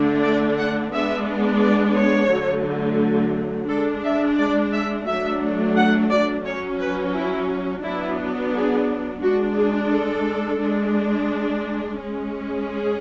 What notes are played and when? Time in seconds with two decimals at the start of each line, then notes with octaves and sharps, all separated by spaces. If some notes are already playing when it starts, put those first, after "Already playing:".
Already playing: D3 A3 D4
0.23 D5
0.58 F#5
0.92 G#3 B3 D4 E5
1.61 D5
1.96 C#5
2.30 D3 F#3 A3
3.69 G#3 D4 A4
4.04 E5
4.38 D5
4.73 E5
5.07 F#3 A3 D4 E5
5.76 F#5
6.11 D5
6.45 F#3 C#4 C#5
6.80 B4
7.14 E4
7.84 F#3 B3 D4 E4
8.53 G#4
9.22 G#3 D4 F#4
9.57 G#4
9.91 A4
10.60 G#3 D4
11.98 G#3 C#4
12.68 G#4